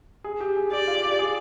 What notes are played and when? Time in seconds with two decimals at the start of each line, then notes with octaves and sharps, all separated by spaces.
0.24 G#4
0.41 G4
0.56 G#4
0.72 G4 D5
0.87 F4
1.04 G4
1.19 G#4